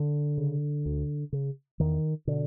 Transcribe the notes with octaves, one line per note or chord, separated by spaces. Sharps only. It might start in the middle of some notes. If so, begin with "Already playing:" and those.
Already playing: D3
C#3
D2
C#3
E2 D#3
B2 D3